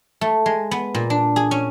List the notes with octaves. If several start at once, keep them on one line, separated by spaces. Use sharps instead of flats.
A3
G#3
B3
A#2
D4
G#4
C#4